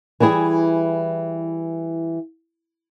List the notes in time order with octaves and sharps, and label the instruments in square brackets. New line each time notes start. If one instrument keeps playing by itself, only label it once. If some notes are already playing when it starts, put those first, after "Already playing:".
[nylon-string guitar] E3 G3 E4 G#4